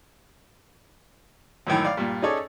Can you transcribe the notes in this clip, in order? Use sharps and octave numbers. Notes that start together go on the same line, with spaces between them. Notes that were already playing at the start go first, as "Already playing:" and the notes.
F#2 A2 D#3 E3
D5 F5
G2 A#2
C#4 D#4 G#4 A4 C#5 D5